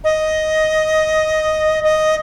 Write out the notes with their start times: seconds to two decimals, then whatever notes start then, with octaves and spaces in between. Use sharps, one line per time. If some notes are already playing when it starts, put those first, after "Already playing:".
0.04 D#5
1.84 D#5